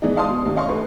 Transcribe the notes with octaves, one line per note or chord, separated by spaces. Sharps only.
E3 G#3 B3 D4 D#4
D5 D#5 F5 A5 C6 D#6
B2
D#2 C3
C#4 D4 D#5 F5 C6 C#6
A1 A3 B4